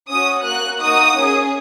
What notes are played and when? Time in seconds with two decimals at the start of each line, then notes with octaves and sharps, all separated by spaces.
0.10 C#4 F#4 D#6
0.45 A#3 F#4 F#6
0.81 A#3 D#4 F#4 D#6
1.17 C#4 G#4